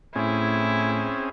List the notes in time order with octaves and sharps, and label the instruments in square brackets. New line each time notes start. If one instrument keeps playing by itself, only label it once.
[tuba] A2 [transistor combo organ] C4 C#4 G#4 [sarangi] E4